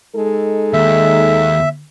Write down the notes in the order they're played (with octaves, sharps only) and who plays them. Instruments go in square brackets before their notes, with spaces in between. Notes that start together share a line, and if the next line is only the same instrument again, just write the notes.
[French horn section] G#3 D#4 A4
[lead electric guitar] D#2 [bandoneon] E5